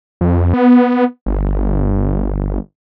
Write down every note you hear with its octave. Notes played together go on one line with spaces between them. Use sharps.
F2
B3
G1